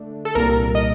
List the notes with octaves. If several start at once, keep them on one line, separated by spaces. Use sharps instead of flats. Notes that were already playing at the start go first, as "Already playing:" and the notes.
Already playing: D3 A3 D4
A4
C2 A#2 G3 A#4
D#5